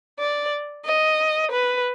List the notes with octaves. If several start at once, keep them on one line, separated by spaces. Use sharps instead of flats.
D5
D#5
B4